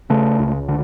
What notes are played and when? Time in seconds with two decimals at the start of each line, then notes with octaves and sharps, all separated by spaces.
0.10 C#3 A3
0.39 C#2
0.68 D3